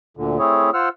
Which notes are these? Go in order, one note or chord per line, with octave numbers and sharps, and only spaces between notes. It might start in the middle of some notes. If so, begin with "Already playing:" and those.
D2 A#2 D3
A3 C4 E4 G#4 C#5
F4 C5 F#5 E6 F6